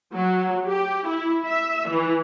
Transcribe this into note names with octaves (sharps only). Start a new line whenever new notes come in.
F#3
G4
E4
E5
E3